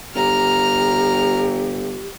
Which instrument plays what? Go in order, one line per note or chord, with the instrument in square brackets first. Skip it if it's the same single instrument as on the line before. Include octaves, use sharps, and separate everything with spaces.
[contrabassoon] G1 [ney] G4 [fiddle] A#5 F6